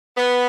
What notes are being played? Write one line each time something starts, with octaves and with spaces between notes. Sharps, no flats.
B3